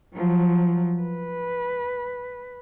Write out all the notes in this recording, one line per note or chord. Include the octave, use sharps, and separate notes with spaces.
F3 F#3
B4